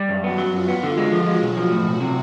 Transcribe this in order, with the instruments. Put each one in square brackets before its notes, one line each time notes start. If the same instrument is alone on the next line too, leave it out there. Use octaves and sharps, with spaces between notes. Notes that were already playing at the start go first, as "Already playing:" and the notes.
Already playing: [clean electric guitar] G3
F#2
[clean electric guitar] B3 [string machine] F#4
[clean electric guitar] F#3
[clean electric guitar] F#2 [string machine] F4
[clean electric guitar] B3
[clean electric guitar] D3 [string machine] F4
[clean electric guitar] G#3
[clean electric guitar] F3 [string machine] F#4
[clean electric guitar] G#3
[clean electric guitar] B1 [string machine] F#4
[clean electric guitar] F3
A2
B1
C3